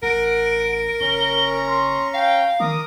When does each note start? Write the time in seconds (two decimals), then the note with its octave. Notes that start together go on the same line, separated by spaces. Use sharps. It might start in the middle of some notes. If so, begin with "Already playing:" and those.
0.03 A1 A#4 F#5 D7
1.01 F#1 C#4 A#5 C#6 G7
1.67 C6
2.14 F5 G5
2.60 D#3 A#4 A#5 D6 D#6